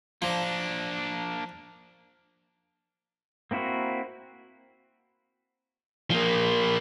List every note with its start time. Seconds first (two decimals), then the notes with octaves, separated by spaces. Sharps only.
0.22 F3 A#3 D4
3.51 A#3 C4 E4 F#4 A#4
6.11 F3 A#3